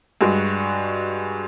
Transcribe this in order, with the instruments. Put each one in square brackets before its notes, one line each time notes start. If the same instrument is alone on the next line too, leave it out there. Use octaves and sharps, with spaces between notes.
[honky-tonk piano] G2 G#3 F#4